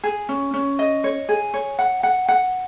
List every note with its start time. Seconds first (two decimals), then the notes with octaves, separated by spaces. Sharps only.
0.03 G#4
0.29 C#4
0.54 C#4
0.79 D#5
1.04 C#5
1.29 G#4
1.54 C#5
1.79 F#5
2.03 F#5
2.28 F#5